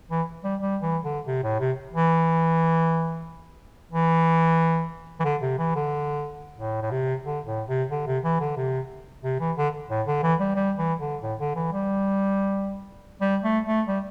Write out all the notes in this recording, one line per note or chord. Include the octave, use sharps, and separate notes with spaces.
E3
G3
G3
E3
D3
C3
A2
C3
E3
E3
E3
D3
C3
E3
D3
A2
A2
C3
D3
A2
C3
D3
C3
E3
D3
C3
C3
E3
D3
A2
D3
E3
G3
G3
E3
D3
A2
D3
E3
G3
G3
A3
A3
G3